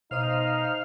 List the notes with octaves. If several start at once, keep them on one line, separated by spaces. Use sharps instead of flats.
B2 D#4 C5 F5 D#6